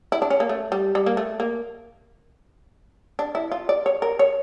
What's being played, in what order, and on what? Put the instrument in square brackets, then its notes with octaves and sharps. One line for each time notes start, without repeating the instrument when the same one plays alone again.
[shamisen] E4
D4
C#4
A#3
A3
G3
G3
A#3
A3
A#3
D4
E4
F4
D5
C#5
A#4
C#5